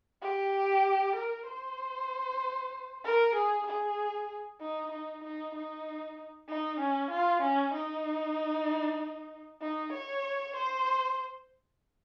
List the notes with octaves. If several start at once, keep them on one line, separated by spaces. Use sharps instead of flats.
G4
A#4
C5
A#4
G#4
G#4
D#4
D#4
D#4
D#4
D#4
C#4
F4
C#4
D#4
D#4
C#5
C5